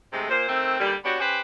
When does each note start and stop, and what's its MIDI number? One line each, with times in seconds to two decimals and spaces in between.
0.12 0.25 44
0.12 0.25 48
0.12 0.25 56
0.12 0.25 57
0.29 0.47 46
0.29 0.47 72
0.48 0.79 51
0.48 0.79 57
0.48 0.79 60
0.80 0.95 39
0.80 0.95 50
0.80 0.95 55
1.05 1.17 59
1.05 1.17 62
1.05 1.17 66
1.05 1.17 67
1.05 1.17 73
1.19 1.41 61
1.19 1.41 67
1.19 1.41 71
1.19 1.41 72